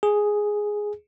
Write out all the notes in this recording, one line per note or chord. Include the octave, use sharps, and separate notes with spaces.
G#4